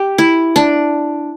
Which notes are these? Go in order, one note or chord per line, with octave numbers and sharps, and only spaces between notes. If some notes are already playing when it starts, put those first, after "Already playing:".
Already playing: G4
E4
D4